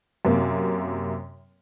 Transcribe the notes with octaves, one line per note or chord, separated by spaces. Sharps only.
F#2 C3 A#3